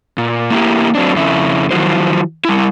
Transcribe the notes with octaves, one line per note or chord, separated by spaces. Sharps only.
A#2
A#3 E4 G4
F#3 C4 D4
F2 C#3 E4
D#3 F3 F#3 E4 F#4 C5
G3 E4